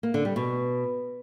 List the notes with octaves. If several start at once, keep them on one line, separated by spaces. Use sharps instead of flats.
A#3
D3
G3
B2